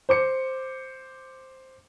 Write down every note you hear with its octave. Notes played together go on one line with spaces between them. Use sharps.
C5 D6 C#7